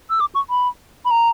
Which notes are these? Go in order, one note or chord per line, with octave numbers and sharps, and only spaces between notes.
E6
D6
C#6
B5
B5
A#5